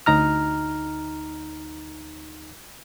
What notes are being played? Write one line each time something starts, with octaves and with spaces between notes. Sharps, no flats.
D2 D#4 A#5 F6